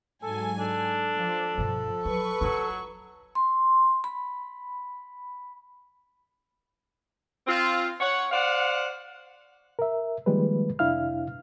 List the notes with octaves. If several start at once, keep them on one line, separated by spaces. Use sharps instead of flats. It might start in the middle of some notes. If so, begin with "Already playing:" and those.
G#2 F#3 A4 G#5
D4 A4
F3
G2 B2 F3
F#3 B4 C#6
F#3 D#4 F4
C6
B5
C4 F4
C#5 F#5
C5 D5 F5 F#5
A#4 E5
D#3 F3 G3 G#3 A#3 B4
F2 C3 D4 E4 F5 F6